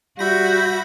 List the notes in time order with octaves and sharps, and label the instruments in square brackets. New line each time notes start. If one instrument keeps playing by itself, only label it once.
[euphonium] G3 [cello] F#4 [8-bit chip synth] E5 B5 A#6 [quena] G6